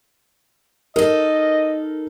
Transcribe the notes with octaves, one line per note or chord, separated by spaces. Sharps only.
D#4 A4 A#4 D#5